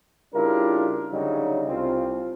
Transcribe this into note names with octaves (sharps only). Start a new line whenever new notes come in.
C#3 G3 D4 E4 F4 A#4
D2 C#3 F#3 G3 D#4
C2 C4 F4